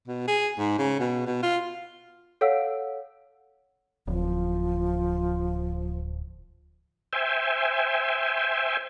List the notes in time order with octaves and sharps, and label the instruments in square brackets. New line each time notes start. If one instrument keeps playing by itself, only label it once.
[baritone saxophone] B2
G#4
G#2
C#3
B2
B2
F4
[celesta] A4 C#5 F5 F#5 E6 D7
[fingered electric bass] D1 [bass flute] F3
[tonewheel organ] C5 E5 G5 G#5